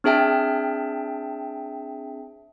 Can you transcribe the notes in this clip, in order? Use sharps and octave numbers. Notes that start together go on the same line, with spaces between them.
C4 D4 G#4 E5 G5 A5